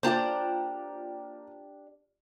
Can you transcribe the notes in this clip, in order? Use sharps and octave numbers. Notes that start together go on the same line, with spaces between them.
A#3 D4 F4 G4 C5 D5 A5